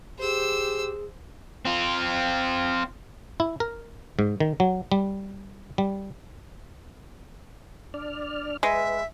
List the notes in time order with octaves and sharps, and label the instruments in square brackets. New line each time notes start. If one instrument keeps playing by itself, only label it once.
[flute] G4 [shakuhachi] G#4 [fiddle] C5 E6
[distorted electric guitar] C4 F4
[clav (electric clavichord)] E4
A#4
G#2
D#3
F#3
G3
G3
[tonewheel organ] D4 D5 F6
[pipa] G#3 [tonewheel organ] B4 [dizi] E5